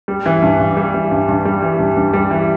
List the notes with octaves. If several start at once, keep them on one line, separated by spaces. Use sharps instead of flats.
G3
E3
G2
G2
G3
E3
G2
G2
G3
E3
G2
G2
G3
E3